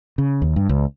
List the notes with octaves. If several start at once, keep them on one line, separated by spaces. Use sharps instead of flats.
C#3
D#2
G2
C#2